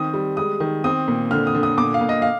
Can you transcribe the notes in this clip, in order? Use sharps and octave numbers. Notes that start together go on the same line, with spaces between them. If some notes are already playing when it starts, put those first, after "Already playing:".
Already playing: D#3 C4 D#6
G3
G#3 D#6
D#3
C4 D#6
A#2
D3 F6
D#6
D3
D#6
A#2 D6
F5
A#2
D#5
F5